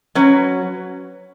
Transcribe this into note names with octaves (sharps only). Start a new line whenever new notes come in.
F#3 C#4 F#4 B4